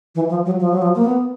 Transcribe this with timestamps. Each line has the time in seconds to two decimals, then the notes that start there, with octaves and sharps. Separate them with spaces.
0.15 E3
0.30 F3
0.46 F#3
0.60 F3
0.71 F#3
0.82 F3
0.96 A#3
1.05 B3